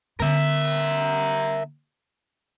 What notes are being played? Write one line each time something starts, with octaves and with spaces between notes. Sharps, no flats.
D3 B3 A#4 E5